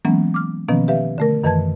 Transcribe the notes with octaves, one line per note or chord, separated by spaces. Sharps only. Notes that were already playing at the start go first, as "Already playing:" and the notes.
E3 F#3 G#3 A#3 B3 C#4
D6 F6
B2 D#3 F3 A#3 B3 C#4
G4 B4 E5 F5
D3 A3 A#4
F#2 D#3 E3 B4 A5 G#6